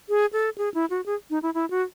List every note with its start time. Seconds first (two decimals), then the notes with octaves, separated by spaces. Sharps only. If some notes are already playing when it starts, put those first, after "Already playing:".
0.09 G#4
0.33 A4
0.58 G#4
0.74 E4
0.90 F#4
1.06 G#4
1.30 D#4
1.42 E4
1.54 E4
1.70 F#4